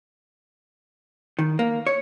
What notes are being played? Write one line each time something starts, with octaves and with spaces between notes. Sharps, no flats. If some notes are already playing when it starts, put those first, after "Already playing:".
D#3
A#3
C#5